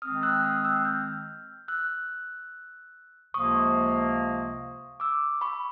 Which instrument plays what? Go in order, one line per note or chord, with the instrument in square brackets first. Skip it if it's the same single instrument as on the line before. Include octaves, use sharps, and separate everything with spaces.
[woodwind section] D#3 G#3 C4 [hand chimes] D#6 F6
[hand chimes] E6 F#6
D#6 F6
E6 F#6
F6 G6
E6 F#6
[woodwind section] C#2 C3 F3 A#3 [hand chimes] C#6 D#6
[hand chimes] D6 E6
B5 C#6